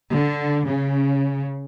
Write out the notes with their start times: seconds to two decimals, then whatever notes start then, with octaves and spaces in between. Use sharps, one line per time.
0.11 D3
0.68 C#3